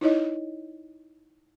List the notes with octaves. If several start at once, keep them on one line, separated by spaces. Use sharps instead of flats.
D#4 E4 C#5 D#5